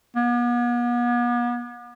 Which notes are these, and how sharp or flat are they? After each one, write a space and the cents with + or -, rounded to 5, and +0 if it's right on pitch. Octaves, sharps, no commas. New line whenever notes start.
B3 -40